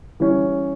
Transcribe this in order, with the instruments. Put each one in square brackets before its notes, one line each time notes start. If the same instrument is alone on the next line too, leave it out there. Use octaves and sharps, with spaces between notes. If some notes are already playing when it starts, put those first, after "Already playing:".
[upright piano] E3 G3 C#4